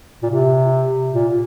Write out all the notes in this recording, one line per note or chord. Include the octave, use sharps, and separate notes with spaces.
A#2
C3
A#2